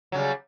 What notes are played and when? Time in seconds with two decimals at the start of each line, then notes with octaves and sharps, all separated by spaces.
0.12 F#3
0.15 C#3
0.17 G3